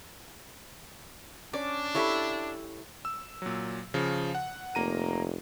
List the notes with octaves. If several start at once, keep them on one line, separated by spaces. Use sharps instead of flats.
C#4 D4 D5
E4 G4 A4 C#5 E5 B5
E6
A#2 F#3
C#3 F3
F#5
F1 A#3 A#5 D#7